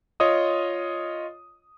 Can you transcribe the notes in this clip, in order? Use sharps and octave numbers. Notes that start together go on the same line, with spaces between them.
F4 C#5 D#5 D#6